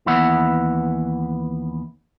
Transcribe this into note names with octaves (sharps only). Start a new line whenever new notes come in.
D#2 E3 B3 B4 E5 F#5